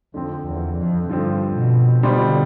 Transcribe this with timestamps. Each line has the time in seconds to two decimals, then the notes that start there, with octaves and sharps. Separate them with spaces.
0.14 F2 D3 F3 C4
0.46 E2
0.77 F2
1.09 G2 D3 F3 C4
1.56 B2
2.03 B2 D3 G3 D4 F4 C5